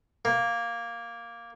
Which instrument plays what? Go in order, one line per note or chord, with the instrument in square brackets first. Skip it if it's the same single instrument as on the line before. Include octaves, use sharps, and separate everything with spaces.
[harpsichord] A#3